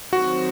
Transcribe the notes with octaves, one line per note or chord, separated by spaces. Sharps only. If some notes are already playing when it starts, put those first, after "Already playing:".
D#3 F#3 C4 F#4